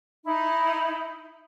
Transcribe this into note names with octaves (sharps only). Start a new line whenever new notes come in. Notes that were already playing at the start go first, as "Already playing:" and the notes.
D#4 E4